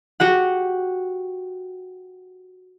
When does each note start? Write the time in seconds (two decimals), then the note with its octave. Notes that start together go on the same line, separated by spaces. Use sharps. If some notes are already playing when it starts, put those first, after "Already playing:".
0.20 F#4 G4 F#5